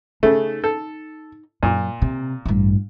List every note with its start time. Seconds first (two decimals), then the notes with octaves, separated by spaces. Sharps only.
0.23 C#3 A3 D#4
0.64 A4
1.63 F#2 A#2
2.02 C3
2.45 A1 G2